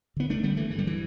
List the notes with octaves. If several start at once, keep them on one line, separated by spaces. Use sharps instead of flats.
D3 B3
A3 D4
D3 G3 B3
E3 A3
G2 E3
G3
E3